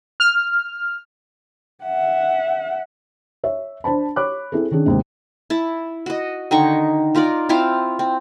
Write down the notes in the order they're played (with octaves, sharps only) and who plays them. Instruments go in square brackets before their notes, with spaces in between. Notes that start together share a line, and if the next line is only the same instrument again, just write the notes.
[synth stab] F6
[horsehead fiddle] E5 F#5
[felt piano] C#5 E5
D4 C5 A5 B5
C#5 B5 D6 F#6
C4 E4 G#4 A4
D#3 C#4 D4 G#4
D#2 G#2 C3
[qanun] E4 A5
F#4 D#5
D3 D#3 D#4 C#6
D#4 F4 A#4 D5
C4 E4 F4 F5
C4